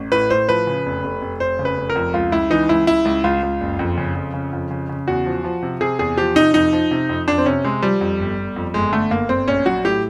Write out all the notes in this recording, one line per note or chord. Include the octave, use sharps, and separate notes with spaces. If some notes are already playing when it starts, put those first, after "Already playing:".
Already playing: A1
A2 B4
A2 C5
F3 B4
C#3
F1
F1
F1
F1 C5
C#3
B4
F1
A#4
F2
C#2 F4
C#2 E4
E3 D#4
C#2 E4
C#2 E4
C#2
C#2 F4
C#2
F#1
F2
C#3
F2
C#3
F2
C#3
C#3
E2 F#4
F3
F3
C3
C3 G#4
E2 G#4
F3 G4
C3 D#4
F2 D#4
F3
C3
F2
F2 D4
C4
C3 C#4
C3 G#3
F3 G3
F2
G1
G1
F2
G1 G#3
D3 A3
G1 A#3
G1 C4
A#1 C#4
F#3 F#4
A2 G4